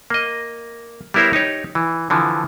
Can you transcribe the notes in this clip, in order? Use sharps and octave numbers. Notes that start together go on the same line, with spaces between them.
A#3 D#5
G3 B3 E4 A#4 C5 C#5
D#4 G4 C#5
E3
D3 E3 F3